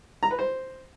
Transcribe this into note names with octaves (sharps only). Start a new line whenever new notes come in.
A#5
B4
C5